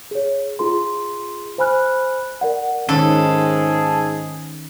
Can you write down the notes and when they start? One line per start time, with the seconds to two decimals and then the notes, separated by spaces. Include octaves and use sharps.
0.11 G#4 C#5
0.59 F4 G#4 C6
1.58 C5 G#5 B5 F6 F#6
2.41 A#4 D5 F#5
2.89 G#2 D#3 C#4 G#4 A4